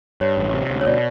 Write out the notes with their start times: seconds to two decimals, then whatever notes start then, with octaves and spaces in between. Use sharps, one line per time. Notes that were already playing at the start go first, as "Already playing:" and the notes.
0.21 G2 C#5
0.38 A1
0.54 C3
0.70 D2
0.81 C#5
0.86 B2 D5